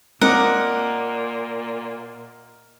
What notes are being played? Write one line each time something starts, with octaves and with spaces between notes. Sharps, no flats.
A#2 G#3 C4 A#4 D#5 F#5 D6